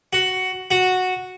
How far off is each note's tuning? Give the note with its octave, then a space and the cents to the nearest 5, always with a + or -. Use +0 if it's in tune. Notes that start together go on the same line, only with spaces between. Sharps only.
F#4 +10
F#4 -5